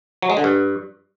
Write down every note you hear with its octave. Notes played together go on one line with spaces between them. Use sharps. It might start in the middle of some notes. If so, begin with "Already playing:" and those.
F#3
G#3
D3
G2